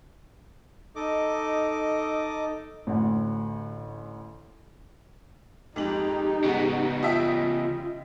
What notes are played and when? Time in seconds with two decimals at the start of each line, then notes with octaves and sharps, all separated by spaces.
0.96 D#4 A4 D#5 D6
2.87 A1 D2
5.76 F2 G#2 D#4 G4 F#7
6.45 C#3 G#3 B3 F#4
7.03 F4 D#5 E5 G5